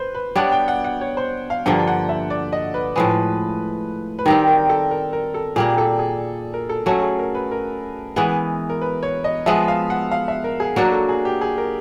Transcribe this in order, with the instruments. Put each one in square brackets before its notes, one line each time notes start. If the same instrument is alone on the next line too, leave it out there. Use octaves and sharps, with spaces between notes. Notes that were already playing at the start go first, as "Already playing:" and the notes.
Already playing: [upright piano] B4 C5
B4
[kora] G3 B3 D4 [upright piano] C#5
[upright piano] G5
F#5
F#5
C#5
C5
F5
[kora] G2 D3 F3 A#3 [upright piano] G5
[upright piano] F#5
E5
D5
D#5
B4
[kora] A2 F3 G#3 [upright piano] B4
[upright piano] B4
[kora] D#3 G3 C4 [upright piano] A#4
[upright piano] A#4
A4
A#4
A#4
A4
[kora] A#2 G3 A#3 [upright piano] G#4
[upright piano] A4
G#4
A#4
A4
[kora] F#3 A3 C#4 [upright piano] A4
[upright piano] G#4
A#4
B4
A#4
[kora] E3 G#3 B3
[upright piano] A#4
B4
C#5
D#5
[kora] F3 G#3 B3 [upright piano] E5
[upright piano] F5
F#5
F5
E5
A#4
G#4
[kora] F#3 A#3 D4 F#4 [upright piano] A#4
[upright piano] A4
G#4
G4
G#4
A#4